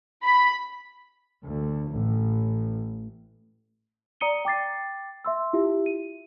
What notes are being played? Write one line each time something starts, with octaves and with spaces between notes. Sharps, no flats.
B5
D2
A1
D5 A#5 D#6 C#7 D#7 G7
G5 D6 A6 C7
E5 C6 E6
E4 F4 G4 E5
D#7